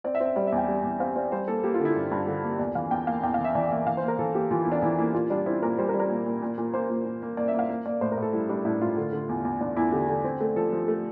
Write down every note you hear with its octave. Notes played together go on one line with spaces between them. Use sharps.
C4 D5
E5
C4
E5
G3 D5
E5
E2
G5
G3
E2
C4 F5
C4 D5
G3 C5
A#3 A4
A#3 G4
F4
D3
E4
G2
G2
D3
A#3
E2 D5
E3 F5
E2 G5
A#3 F5
E2 G5
E3 F5
E5
E3 D5
A#3 E5
E3 F5
C5
A#3
A#4
E3 A4
A#3 G4
E3 F4
E4
E2
D4
E3 E4
A#3 E4
A#2 F4
G3 D4
C4 E4
A#2 A#4
G3 C5
A#4
G3
A#4
A#2
A#2
A#2
A#2
A#3 C5
A#2
A#2
A#3
A#3 D5
E5
A#3
F5
A#3
A#3 D5
A2 C5
A#4
A2 A4
G3 E4
G3 D4
A2 E4
A2 F4
D3
D3
E2
E2
E2 D4
E2 E4
D3 G4
D3
C4
A3
F3 A4
F3
A3